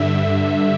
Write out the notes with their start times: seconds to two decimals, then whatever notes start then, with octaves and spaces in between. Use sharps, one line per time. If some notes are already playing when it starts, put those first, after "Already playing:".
Already playing: G2 D3 E5